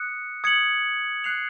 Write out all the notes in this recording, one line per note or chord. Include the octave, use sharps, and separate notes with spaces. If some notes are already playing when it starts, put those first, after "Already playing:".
Already playing: D#6 F#6 C#7
D#6 G#6 C#7 F#7
F#6 C7 F7